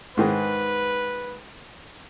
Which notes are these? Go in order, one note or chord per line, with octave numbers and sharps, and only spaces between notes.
G#2 D#3 G#4 B4